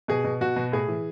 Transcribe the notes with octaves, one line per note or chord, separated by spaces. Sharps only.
B2 G#4
B2
B2 F#4
B2
A2 G#4
E3